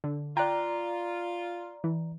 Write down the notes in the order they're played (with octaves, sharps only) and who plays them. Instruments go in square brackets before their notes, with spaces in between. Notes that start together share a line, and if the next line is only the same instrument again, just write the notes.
[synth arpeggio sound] D3
[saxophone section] F4 [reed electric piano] D5 A#5 [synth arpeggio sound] G5 F#6
[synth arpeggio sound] E3